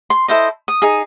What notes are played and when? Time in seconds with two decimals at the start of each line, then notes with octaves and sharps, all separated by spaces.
0.10 C6
0.28 E4 A4 C5 D#5
0.68 D#6
0.82 D#4 G#4